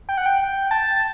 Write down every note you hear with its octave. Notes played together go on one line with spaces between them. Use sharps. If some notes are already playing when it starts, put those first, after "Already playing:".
G5
F#5
G5
A5
A5